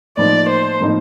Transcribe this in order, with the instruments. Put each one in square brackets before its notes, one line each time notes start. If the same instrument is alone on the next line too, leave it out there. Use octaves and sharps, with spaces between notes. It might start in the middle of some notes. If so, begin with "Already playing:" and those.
[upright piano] A2 F3 A#3 D#4 [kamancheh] D5
[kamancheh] C5
[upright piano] A2 F3 A#3 D#4